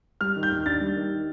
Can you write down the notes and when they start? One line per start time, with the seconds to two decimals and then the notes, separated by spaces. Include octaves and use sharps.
0.21 G3 F6
0.36 D#3
0.43 G6
0.51 D#2
0.66 D4 A6
0.81 G3
0.96 D#3